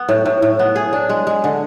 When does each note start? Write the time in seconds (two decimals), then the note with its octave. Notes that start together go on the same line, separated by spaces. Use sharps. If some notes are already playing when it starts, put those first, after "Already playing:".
Already playing: B3
0.09 A2
0.26 A2
0.42 A2
0.59 B3
0.76 G#4
0.93 D4
1.09 G#3
1.27 G#3
1.44 D3